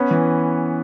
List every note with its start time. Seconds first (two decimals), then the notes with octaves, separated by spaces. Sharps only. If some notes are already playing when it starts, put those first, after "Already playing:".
Already playing: B3 C#4
0.11 E3